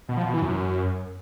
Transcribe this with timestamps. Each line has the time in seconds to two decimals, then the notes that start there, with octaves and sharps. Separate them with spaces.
0.09 B2
0.17 F3
0.25 B2
0.34 E3
0.42 F#2